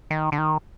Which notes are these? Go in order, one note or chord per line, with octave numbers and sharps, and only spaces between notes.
D#3
D3
D#3